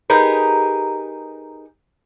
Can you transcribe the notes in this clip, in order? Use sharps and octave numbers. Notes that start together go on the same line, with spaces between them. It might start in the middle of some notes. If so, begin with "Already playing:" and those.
D#4 G4 G#4 A#4 B4